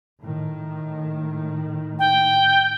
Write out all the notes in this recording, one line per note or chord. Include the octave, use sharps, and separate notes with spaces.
A2 D#3
G5